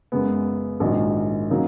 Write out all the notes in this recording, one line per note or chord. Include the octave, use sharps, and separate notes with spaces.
F#2 C#3 G#3 B3
A#1 G#2 D#3 F#3
C#3 F#3 A#3 D#4